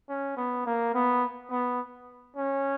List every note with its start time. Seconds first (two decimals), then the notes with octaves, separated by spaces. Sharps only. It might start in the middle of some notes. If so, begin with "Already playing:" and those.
0.09 C#4
0.37 B3
0.66 A#3
0.95 B3
1.51 B3
2.37 C#4